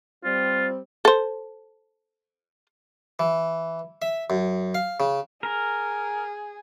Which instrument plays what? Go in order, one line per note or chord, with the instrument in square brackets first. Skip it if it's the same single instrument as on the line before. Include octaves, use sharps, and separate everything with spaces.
[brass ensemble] G3 C4 [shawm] F4
[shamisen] A4 C5
[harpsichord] E3
E5
F#2
F5
C#3
[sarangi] G#4 [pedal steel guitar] A#4